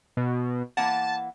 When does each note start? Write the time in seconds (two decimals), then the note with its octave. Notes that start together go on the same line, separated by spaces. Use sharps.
0.17 B2
0.77 E3 A#3 F#5 A5